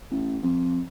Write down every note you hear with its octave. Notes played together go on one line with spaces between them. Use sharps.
A1
F2